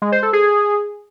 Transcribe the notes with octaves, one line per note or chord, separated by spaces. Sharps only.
G#3
C5
A4
G#4